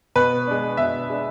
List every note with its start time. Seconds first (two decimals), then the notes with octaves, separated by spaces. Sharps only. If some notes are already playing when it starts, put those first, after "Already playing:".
0.16 B2 B4
0.47 G#3 D4
0.77 B2 E5
1.09 G#3 D4